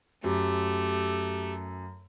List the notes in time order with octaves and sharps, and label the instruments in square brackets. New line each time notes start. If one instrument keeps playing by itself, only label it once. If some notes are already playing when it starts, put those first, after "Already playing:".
[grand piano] F#2 [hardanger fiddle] A3 [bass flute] G4